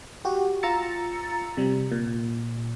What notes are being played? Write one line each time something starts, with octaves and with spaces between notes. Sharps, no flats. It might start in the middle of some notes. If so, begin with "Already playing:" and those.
F#4 G4
F4 A#5 E6 A6 C#7
C3 G3
A#2